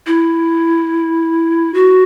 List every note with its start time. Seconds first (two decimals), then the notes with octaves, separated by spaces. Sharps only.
0.07 E4
1.74 F#4